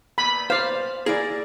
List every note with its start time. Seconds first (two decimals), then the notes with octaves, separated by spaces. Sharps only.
0.18 A#2 B3 B5
0.50 C5 D5 F5
1.06 A#3 E4 G#4 D5